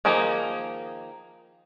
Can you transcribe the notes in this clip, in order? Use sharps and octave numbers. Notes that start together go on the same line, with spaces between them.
D#3 F3 A#3 D#4 G#4